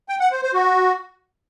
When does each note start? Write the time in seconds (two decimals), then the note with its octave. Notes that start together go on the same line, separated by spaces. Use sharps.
0.09 G5
0.20 F#5
0.31 C5
0.43 C5
0.54 F#4